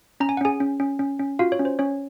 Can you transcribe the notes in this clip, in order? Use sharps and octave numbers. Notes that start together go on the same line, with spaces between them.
C#4 A#5
G#5
F#5
C#4 G#4 G#5
C#4
C#4
C#4
C#4
F4 F#4 F5
C#5
C#4
C5
C#4 C#5